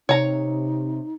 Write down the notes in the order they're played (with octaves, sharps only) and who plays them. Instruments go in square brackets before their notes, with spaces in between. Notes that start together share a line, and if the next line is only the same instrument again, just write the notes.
[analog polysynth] C3 [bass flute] D#4 [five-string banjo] C#5 A#5